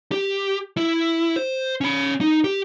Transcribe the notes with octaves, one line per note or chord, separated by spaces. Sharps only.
G4
E4
C5
C#4 B5
D#4
G4